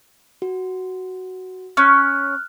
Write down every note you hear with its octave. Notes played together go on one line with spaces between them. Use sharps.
F#4
C#4 F6 F#6